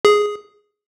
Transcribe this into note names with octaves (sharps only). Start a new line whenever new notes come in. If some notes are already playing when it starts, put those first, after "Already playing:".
G#4